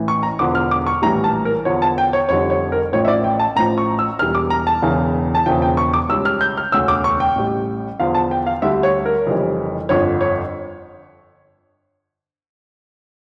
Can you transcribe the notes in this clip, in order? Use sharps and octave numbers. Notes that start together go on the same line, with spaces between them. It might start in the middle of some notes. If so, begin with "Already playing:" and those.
Already playing: A1 A2 E3
C#6
A#5
E1 E2 D3 F3 D6
F6
D6
C#6
A#1 A2 E3 G3 A#5
A5
A#4
E2 D3 F3 C#5
A5
G5
C#5
F1 F2 D3 G3 C#5
C#5
A#4
A1 A2 F3 C#5
E5
D5
G5
A5
A1 A2 F3 A#5
C#6
E6
E1 E2 E3 G3 F6
D6
A#5
A5
E1 E2 C#3 E3
A5
E1 E2 C#3 F3 G5
G5
C#6
D6
C#2 C#3 G3 E6
F6
G6
F6
E1 D2 C#3 E6
D6
C#6
G5
A1 A2 G3
E2 D3 F3 F5
A5
G5
F5
D2 D3 G3 E5
C#5
A#4
F1 F2 C#3 E3 G3
G1 F2 D3 F3 C#5
C#5